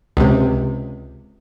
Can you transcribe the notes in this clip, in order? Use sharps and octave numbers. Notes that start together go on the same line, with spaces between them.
C#2 C3